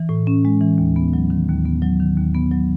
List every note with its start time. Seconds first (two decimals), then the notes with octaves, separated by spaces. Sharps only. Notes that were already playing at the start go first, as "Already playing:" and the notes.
Already playing: E3
0.09 A2
0.27 C#4
0.45 G#3
0.61 E3
0.78 D#2
0.96 B3
1.13 F#3
1.30 D#3
1.48 D#2
1.65 B3
1.82 F#3
2.00 D#3
2.17 D#2
2.35 B3
2.51 F#3